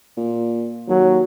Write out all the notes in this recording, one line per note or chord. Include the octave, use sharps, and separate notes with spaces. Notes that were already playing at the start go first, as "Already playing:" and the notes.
A#2
D#2 F#3